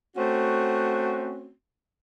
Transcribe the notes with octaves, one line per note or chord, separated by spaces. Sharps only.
A3 C4 C#4 F#4